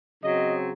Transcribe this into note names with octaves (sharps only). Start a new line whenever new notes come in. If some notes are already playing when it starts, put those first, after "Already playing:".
C#3 F#3 C4 D#5